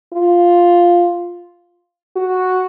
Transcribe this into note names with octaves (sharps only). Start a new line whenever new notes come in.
F4
F#4